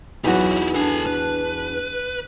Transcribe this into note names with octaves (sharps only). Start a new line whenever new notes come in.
E2 F#3 B3 D#4 E4 F#4
D4 A4 G#5
B4